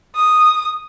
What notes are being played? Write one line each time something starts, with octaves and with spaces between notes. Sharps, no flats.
D#6